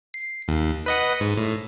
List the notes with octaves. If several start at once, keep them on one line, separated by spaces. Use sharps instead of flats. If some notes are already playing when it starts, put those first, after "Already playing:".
C7
D#2
B4 D#5 F#5
G#2
A2